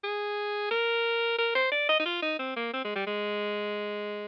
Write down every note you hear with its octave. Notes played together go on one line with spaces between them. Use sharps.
G#4
A#4
A#4
C5
D5
D#5
D#4
F4
D#4
C4
A#3
C4
G#3
G3
G#3